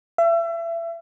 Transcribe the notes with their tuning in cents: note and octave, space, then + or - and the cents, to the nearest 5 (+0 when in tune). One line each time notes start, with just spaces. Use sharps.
E5 +30